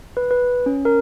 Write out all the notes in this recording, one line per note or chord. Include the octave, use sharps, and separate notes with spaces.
B4
B4
C#4
A#4